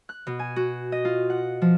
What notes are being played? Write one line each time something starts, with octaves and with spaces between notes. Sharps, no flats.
F#6
B2
G#5
F#4
D#5
F4
F#5
F3